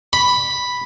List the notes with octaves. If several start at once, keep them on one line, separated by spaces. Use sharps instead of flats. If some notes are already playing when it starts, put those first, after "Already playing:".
B5